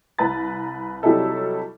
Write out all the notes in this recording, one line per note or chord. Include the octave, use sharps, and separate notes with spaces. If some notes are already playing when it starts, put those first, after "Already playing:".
C2 B4 A#5 A6
C3 F#3 G3 D#4 E4 A4